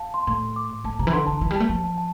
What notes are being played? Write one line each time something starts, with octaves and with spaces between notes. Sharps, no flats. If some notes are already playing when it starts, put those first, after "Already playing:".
Already playing: F5 A5
C6
A2 C6
D6
A2 A5
C3 A#5
E3
D3 C6
D3 A5
E3
G3
A5
A3
F3 A5
A5
A5